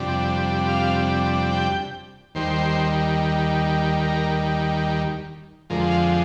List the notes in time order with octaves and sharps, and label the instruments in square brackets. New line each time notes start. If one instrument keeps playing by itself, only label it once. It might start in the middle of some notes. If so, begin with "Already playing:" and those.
Already playing: [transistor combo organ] F2 C3 G3 D4
F5
G5
D#2 D#3 G3 C5
A#4
F2 D3 F3 G#3 A#4
F5